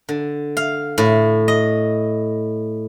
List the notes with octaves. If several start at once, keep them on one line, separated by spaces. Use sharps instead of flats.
D3
F5
A2
D#5